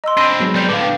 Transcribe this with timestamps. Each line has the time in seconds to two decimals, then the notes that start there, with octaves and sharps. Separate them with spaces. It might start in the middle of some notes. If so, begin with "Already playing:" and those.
0.04 D#5 A#5 C6 E6
0.17 C4 D4 B5 C6 A#6 D#7
0.40 F#3 G#3 B3
0.55 G3 C4 D5 G6 F7
0.69 A2 D3 B4 F5 D6
0.81 G5